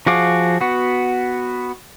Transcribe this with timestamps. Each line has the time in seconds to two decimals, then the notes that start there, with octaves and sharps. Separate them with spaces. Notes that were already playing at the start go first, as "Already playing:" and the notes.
0.07 F3 F#4 G#4 F5 D6
0.61 B3 F#4